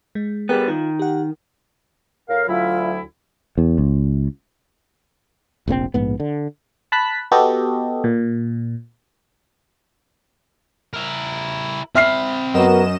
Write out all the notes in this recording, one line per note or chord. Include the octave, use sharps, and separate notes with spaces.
G#3
G3 B3 G#4 A#4 G5
D#3 F4
G4 F#5
A2 A#4 F5
D2 F#3 E4 F4
E2
C#2
F1 A#1 C3 C4
A#1 G#2 B3
D3
A5 B5 F#6 B6
B3 F#4 G4 A4 D#5
A#2
E4 A#4
C4 E5 B5 F6 C7
F#2 B3 F#4 A#4 D#5 E7